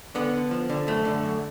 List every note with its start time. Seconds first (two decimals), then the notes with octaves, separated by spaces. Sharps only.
0.15 D3 B3
0.33 D3
0.51 F3
0.70 D3
0.87 F#2 A3
1.05 D3
1.23 F#2